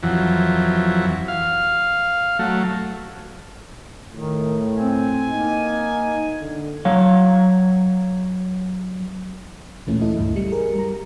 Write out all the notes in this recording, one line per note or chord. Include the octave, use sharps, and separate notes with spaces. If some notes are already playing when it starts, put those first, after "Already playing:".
F2 E3 F#3
F5
F#3 A3
A2 D#3
C4 G#5
A#3 D#4
D3
F#3 C#5 F5
D2 A#2 E3 A3 C#4
E4 A4 D#5
C#2 G2
G3 E4 C#7
G#4 A#4
G3 A#5